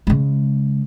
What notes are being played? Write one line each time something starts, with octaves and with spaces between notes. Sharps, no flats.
C#3 G#3